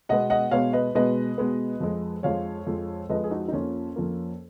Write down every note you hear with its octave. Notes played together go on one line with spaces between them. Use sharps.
B2 G#3 B3 D#5 F#5
D#5 F#5
B2 G#3 B3 C#5 F5
B4 D#5
B2 G#3 B3 B4 D#5
B2 G#3 B3
F2 F3 G#3
F2 F3 G#3 C#5 F5
F2 F3 G#3
F2 F3 G#3 B4 D#5
G#4
D#4 F#4
D#4
F2 F3 A#3 C#4 F4
F2 F3 A#3